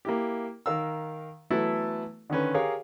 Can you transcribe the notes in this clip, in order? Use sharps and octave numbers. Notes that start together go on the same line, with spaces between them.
A#3 E4 G4
D#3 A#4 F5 E6
E3 F#3 A3 B3 E4 A4
D3 D#3 C#4 B4
G4 G#4 A#4 C#5 F5